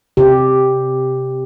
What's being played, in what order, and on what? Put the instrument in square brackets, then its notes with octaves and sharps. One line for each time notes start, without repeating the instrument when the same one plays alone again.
[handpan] C3 G4